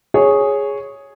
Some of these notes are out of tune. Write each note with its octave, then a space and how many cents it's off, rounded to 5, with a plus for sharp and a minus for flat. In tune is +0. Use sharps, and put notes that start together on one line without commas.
G#4 +0 C#5 +0